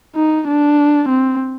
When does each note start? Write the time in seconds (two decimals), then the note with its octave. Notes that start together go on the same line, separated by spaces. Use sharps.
0.16 D#4
0.48 D4
1.09 C4